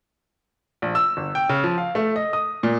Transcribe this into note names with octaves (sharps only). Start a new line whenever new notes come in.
A#1
E6
G1
G5
C#3
F3
F5
A3
D#5
D#6
A#2